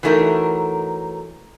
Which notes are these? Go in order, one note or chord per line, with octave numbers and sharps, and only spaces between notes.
E3 F#3 A3 D#4 A#4